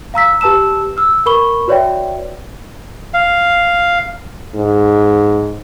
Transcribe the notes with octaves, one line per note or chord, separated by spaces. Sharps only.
F5 A#5 E6 B6
G4 B4 A5 E6 E7
E6 F6
A#4 B4 B5 C#6 G7
F#4 B4 C#5 D5 E5 G5
F5
G#2